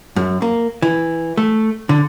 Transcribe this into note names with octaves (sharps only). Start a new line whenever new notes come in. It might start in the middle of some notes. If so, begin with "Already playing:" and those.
F#2
A#3
E3
A3
D3